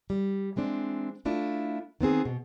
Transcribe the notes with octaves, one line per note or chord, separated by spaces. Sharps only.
G3
E3 G#3 C4 D4
A3 D4 E4 F4
D#3 B3 C4 G#4
B2